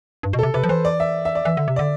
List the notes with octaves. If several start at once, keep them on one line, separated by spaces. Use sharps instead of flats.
G2
B2
C3 A4
C3 B4
F3
E3 C5
D5
E5
E5
D5
E3 E5
D3
C3
D3 D5